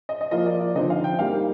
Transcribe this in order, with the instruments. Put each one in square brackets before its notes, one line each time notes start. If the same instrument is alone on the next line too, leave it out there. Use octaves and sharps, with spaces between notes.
[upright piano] D#5
D#5
F3 A#3 F4 D#5
D5
D5
D3 F3 C4 D#4 D#5
F5
G5
G3 A#3 D#4 F5